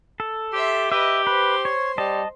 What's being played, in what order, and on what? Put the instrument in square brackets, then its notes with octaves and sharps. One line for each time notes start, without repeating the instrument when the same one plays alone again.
[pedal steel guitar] A4
[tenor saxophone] G4 [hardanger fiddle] E5 C6
[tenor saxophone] G4 [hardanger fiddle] B4 D#5 [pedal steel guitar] E5
[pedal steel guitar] B4 [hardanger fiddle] C5 C6
[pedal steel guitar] C#5
[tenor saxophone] G3 [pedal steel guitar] D#5 A5